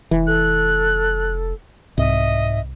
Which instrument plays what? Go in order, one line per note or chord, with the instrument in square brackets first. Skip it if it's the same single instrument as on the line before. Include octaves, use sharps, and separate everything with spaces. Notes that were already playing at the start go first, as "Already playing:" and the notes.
[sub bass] F1 [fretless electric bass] E3
[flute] A4 [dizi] F#6
[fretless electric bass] C2 [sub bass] G#2 [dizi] D#5 [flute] E5